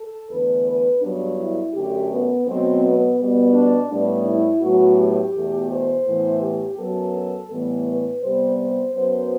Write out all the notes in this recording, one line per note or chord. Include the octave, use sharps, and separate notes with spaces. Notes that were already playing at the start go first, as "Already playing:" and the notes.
Already playing: A4
E2 D3 A3 B4
B4
G2 F#3 B3 D4
E4
F#2 D3 A3 G4
B3
B2 F#3 A3 C4
B3
B2 G3 B3
D4
A2 G3 B3 D4
E4
A2 F#3 B3 F#4
G4
E2 B2 A3
C5
A2 E3 B3
G4
F#2 F#3 B3 A4
A2 E3 G3 B3
B4
C3 G3 B3 C5
C5
F#2 F#3 B3 C5